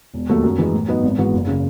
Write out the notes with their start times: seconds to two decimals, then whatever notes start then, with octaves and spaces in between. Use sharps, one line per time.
0.14 E1
0.29 D#2 D#3 F#3 A3
0.44 F#2
0.58 E3 G#3
0.73 A2
0.88 F#3 B3 D#4
1.03 G#1
1.18 G#2 E3 B3 F#4
1.33 F#1
1.47 C#3